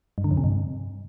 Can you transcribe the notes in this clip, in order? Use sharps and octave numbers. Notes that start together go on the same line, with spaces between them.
G2
D3
F2
C3
G2